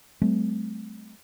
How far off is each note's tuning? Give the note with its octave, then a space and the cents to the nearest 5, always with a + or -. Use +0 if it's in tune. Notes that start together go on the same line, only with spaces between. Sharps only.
F#3 +45 A3 -35 C4 -35